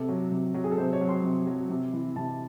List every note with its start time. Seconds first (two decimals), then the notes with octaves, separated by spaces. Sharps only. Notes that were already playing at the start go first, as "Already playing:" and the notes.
Already playing: C3 A4
0.08 F#3
0.32 C3
0.54 F#3
0.64 G#4
0.71 A4
0.78 C3 C5
0.93 C#5
1.01 F#3
1.09 C6
1.24 C3
1.47 F#3
1.70 C3
1.93 E3
2.16 C3 A5